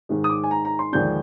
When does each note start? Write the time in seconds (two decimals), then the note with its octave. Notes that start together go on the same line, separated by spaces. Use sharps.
0.09 G#2 D#3 G#3
0.24 D#6
0.30 D6
0.44 G#5
0.51 A#5
0.65 A#5
0.79 C6
0.93 D#2 D3 F3 G#3 D4 G6